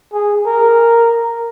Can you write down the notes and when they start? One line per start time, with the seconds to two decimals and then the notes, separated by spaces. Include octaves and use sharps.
0.13 G#4
0.46 A#4